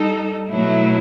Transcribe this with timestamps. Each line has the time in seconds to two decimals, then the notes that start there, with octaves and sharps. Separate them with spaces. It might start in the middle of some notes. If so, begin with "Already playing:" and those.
Already playing: G3 D#4 A4
0.49 B2 F#3 A3 E4